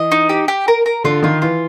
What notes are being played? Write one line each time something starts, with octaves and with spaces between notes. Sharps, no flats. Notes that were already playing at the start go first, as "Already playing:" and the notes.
Already playing: E3 D#5
D#4
G4
G4
A#4
A#4
D3 F4
D#3 F4
E3 F4